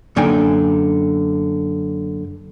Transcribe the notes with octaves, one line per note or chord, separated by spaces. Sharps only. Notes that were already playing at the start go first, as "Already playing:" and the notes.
F#2 D3 A#3 D#4 G5 G#5